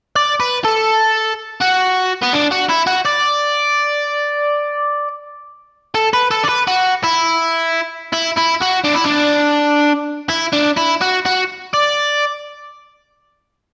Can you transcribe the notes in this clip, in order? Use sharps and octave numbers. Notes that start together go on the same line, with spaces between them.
D5
B4
A4
F#4
B3
D4
F#4
E4
F#4
D5
A4
B4
A4
D5
B4
F#4
E4
E4
E4
F#4
D4
E4
D4
E4
D4
E4
F#4
F#4
D5